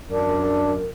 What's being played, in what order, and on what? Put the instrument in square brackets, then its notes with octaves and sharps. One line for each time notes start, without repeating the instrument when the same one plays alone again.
[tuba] F#2 [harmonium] D4 [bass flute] A#4